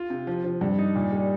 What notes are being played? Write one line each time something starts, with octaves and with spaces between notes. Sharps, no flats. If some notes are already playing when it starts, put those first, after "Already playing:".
Already playing: F4
C3
F3
F3
G2
D#4
A#2
G3